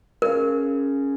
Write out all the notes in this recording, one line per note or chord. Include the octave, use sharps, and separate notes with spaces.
C#3 A#4